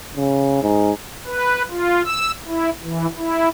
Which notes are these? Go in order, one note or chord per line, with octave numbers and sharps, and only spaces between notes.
C#3
G#2
B4
F4
E6
E4
E3
E4